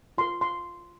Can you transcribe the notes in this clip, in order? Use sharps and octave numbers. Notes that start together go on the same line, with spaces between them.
F4 A#4 C6
C6